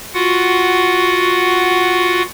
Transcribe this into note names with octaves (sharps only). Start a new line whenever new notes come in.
F4 F#4 F#5